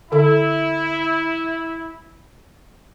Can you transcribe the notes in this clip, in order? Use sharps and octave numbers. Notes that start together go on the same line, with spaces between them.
D3 E4 A4